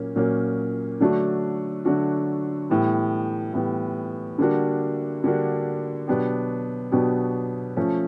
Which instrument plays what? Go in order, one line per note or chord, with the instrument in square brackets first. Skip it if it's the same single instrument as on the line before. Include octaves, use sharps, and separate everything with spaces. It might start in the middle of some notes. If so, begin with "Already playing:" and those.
Already playing: [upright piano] A#2 F#3 A#3 C#4
A#2 F#3 A#3 C#4
D3 F#3 A3 D4 F#4
D3 F#3 A3 D4 F#4
A2 E3 G3 B3
A2 E3 G3 B3
D3 G3 A#3 D4 F#4
D3 G3 A#3 D4 F#4
B2 F#3 B3 D4 G4
B2 F#3 B3 D4 G4
F3 A3 C#4